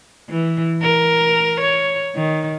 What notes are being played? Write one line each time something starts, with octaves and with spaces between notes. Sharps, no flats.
E3
A#4
C#5
D#3